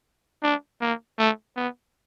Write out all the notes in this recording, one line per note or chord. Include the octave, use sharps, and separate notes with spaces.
D4
A#3
A3
B3